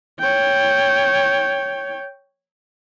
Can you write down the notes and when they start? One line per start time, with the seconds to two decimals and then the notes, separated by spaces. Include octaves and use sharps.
0.20 C#5 G5